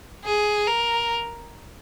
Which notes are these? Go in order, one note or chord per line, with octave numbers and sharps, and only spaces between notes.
G#4
A#4